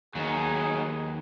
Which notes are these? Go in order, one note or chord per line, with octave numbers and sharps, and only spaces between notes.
D#2 F#3 D#4 G#4